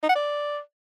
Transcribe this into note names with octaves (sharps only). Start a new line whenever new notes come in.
D#4
F#5
D5